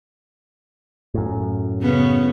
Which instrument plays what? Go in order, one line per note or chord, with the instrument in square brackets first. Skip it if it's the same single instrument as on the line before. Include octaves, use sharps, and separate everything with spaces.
[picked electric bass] F#2 A2
[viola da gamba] C#3 B3 C#4